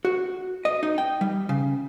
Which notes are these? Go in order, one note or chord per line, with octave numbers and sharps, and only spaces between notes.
F#4
D#5
D#4
G5
G3
C#3